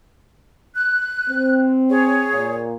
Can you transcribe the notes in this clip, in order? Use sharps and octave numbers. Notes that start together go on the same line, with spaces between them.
F#6
C4
G#4 C#5
A#2